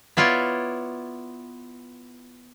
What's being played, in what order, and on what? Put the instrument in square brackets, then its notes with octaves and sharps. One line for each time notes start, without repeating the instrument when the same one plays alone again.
[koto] B3 E4 F4 C#5 D5